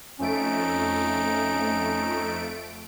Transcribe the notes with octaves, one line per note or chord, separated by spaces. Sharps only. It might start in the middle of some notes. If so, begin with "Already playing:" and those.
F2 A3 C#4 D#4 D7